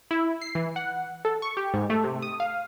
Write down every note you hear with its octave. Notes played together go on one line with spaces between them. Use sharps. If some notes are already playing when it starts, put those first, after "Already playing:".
E4
C7
E3
F#5
A4
C#6
G4
G#2
A3
C3
D#6
F5